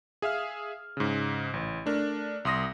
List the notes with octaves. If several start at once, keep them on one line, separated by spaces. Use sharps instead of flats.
G#4 E5 F5 F6
G#2 C#3
A1
A3 D4 A#4
C2 C6 D#6 A#6